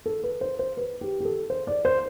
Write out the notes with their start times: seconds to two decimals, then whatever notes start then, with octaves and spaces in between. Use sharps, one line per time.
0.06 A4
0.24 B4
0.41 C5
0.59 C5
0.77 B4
1.01 G4
1.20 G4
1.25 A4
1.50 C5
1.67 D5
1.85 C5